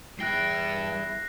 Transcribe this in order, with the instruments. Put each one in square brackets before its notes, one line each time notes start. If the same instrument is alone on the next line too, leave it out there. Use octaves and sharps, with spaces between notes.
[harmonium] E2 E4 [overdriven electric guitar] G2 G5 [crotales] F#6 A#6 C7